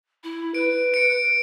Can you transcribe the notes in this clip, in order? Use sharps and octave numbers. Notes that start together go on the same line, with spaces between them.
E4
B4 D7
C#7 D7